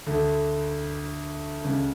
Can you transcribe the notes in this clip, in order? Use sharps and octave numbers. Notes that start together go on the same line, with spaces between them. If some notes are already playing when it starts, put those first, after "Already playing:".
D2 D3
C#2 C#3